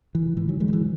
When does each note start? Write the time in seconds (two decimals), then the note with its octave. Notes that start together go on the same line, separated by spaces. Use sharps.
0.15 E3
0.37 G#2 E3
0.49 D#3 F#3
0.60 E3 G#3
0.68 D#3
0.73 E3